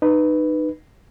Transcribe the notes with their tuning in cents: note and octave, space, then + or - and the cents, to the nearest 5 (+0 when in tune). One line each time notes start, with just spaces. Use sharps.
D#4 -25 B4 +0